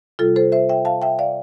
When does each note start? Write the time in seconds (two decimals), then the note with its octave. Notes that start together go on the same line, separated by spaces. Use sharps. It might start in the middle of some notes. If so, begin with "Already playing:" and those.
0.19 C3 G3 F4 A4
0.36 A4 C5
0.52 C5 E5
0.69 E5 G5
0.85 F5 A5
1.02 E5 G5
1.19 D5 F5